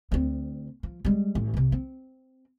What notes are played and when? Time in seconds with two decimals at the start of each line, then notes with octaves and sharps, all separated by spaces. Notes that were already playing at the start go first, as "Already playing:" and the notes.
0.12 D2 C4
0.83 F3
1.05 G3 G#3
1.35 A1
1.54 C2 C3
1.72 C4